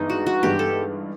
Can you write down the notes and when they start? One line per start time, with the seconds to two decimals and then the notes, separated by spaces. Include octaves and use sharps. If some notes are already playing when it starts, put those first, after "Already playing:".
Already playing: G2 E3 G#3 B3 D4 D#4
0.10 F#4
0.26 F#4
0.43 G2 E3 G#3 B3 D4 G4
0.59 A4